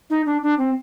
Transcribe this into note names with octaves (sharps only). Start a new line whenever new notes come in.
D#4
D4
D4
C4